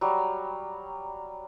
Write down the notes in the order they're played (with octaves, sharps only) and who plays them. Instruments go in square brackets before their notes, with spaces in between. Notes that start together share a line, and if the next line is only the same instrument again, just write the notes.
[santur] F#3 G3